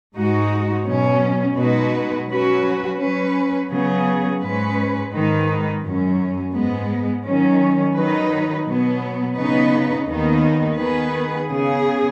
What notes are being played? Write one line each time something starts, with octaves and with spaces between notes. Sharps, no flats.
G#2 G#3 D#4 F#4
B2 F#3 C#4
B2 G#3 D#4 F#4 B4
F#3 C#4 F#4 B4
F#3 C#4 B4
C#3 F#3 B3 G#4
G#2 G#3 C#4 B4
G#2 D#3 G#3 D#4 B4
F#2 F#3 C#4
G#2 G#3 B3
D#3 F#3 C#4
D#3 F#3 D#4 B4
B2 F#3 B3
C#3 B3 D#4 B4
D#2 D#3 B3 D#4
D#3 B3 G#4 B4
C#3 B3 G#4